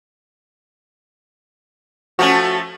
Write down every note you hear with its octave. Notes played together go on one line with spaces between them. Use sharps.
F3 A3 C#4 F#4